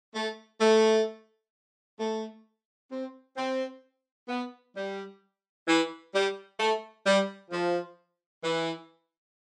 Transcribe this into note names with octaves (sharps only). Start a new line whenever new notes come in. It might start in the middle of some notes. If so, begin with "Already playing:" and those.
A3
A3
A3
C4
C4
B3
G3
E3
G3
A3
G3
F3
E3